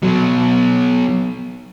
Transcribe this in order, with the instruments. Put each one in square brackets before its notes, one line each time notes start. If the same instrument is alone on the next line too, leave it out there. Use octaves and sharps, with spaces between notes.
[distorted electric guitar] B2 F#3